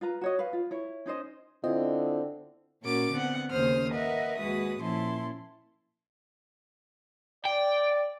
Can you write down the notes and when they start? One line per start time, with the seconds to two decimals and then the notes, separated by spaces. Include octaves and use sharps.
0.01 F4 B4 A#5
0.21 F#4 C#5 D#5
0.39 B4 F5
0.53 F4
0.71 E4 C#5
1.06 C#4 D#4 C5 D#5
1.64 D3 C4 E4 F4 D#5
2.82 A#2 C#4 F#4 A#4 D6 A6
3.11 D3 B3 C4 F#5
3.51 D#2 C#3 C5 D#6 F6
3.92 A#4 B4 D#5 E5 F#5
4.37 D#2 G#3 F#4 B4 D#6
4.80 A#2 F3 C#4 E4 A5 C6
7.45 D5 G5